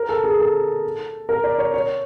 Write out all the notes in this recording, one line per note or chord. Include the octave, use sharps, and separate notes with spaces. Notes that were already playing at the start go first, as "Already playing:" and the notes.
Already playing: A#4
A4
G#4
A4
A#4
D5
C#5
C#5